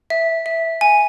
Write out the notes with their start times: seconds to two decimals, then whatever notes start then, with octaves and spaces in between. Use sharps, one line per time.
0.10 E5
0.46 E5
0.81 G#5